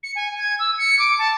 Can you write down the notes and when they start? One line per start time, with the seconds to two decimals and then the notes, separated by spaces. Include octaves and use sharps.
0.03 C#7
0.16 G#5
0.38 G#6
0.59 E6
0.78 C#7
0.99 D6
1.18 A5